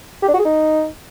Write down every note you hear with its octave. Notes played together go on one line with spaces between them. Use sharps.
G4
D4
F#4
G#4
D#4